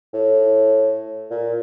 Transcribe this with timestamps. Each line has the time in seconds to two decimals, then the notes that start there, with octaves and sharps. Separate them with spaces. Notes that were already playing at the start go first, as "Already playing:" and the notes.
0.14 A2
1.31 A#2